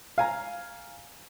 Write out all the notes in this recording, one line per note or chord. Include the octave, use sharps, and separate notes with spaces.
F5 G#5 A#5